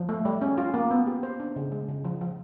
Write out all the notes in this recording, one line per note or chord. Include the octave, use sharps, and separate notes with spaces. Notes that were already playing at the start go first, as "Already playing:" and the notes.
Already playing: F3
A3
G3
C#4
F4
A#3
B3
G4
C5
D4
C#3
G#3
C#3
F3
F3